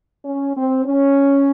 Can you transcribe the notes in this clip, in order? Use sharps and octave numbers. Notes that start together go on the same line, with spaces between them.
C#4
C4
C#4